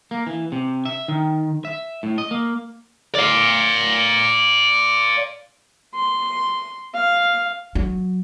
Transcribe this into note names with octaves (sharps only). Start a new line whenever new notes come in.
A#3
E3
C3
E5
D#3
E5
A2
D#5
A#3
D5 F5
C6
F5
F#3